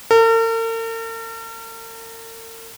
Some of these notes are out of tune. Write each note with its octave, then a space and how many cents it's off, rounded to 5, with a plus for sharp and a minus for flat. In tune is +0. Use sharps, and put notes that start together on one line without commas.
A#4 -45